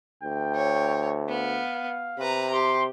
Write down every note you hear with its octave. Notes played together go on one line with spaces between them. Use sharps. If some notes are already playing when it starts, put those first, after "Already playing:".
D2 G5
C#5
B3 F5
C3 B4 A#5
G4 C6